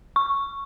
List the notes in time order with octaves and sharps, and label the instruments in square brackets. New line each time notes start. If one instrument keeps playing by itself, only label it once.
[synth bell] C#6